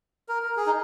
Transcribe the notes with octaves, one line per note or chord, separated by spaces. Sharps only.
A#4
A#4
G#4
D#4